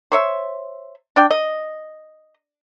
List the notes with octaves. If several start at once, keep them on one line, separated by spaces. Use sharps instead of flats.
C5 C#5 E5
D4 D5 G5
D#5